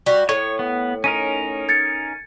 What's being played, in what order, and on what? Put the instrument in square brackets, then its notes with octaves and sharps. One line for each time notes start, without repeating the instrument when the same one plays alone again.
[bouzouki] G3 F#4
[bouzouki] A2 [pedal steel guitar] C#5
[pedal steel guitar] B3
[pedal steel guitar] C#4 D#4 A#4 [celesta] D#7
[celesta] G#6 A6 C#7